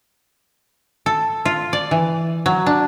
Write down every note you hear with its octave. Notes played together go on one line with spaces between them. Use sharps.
A4
F4
D5
E3
F#3
D4